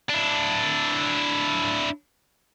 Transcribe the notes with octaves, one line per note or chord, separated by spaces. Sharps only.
D4 E4